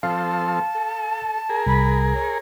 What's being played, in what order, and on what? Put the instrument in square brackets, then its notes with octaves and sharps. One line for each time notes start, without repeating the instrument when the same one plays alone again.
[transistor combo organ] F3 C4 A4 [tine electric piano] F5 [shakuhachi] A5
[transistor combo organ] A4
G#4 A#4
[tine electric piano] C2 [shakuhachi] B5
[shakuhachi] C#5